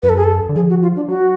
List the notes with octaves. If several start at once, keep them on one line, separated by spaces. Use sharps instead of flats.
F#2 B4
A4
G#4
A4
D3
F3 G#4
F#4
F4
D4
F#3 F#4